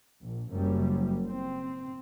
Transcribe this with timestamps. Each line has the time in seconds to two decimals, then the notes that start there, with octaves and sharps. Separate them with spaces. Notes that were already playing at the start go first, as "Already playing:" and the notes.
0.21 A#1
0.51 F#1 F#2 G3
1.26 C4